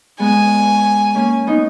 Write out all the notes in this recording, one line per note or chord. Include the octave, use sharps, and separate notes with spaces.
G#3 B3 G#5
A#3 C#4
B3 D#4